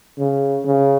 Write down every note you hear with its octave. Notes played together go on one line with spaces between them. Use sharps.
C#3
C#3